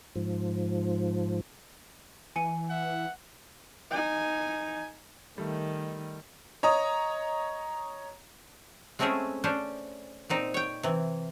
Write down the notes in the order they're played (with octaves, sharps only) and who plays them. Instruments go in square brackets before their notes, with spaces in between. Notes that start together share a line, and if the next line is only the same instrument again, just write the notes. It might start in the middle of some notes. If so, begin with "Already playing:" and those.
[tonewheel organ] G#2 F3
[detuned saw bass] E3 [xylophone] G#5 C#7 D#7
[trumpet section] E5 F#5
[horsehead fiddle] D#4 G#5
[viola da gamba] D#3 [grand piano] G3 A3
[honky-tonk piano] C#5 D#5 A#5 D#6
[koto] G#3 A3 C4 C#4 E4 G#4
C#4 D4 C5
A#2 C4 D#4
C#5 G5
C3 E3